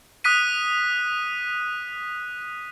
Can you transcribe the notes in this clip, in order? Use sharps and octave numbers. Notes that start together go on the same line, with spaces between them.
D#6 F#6 B6 D#7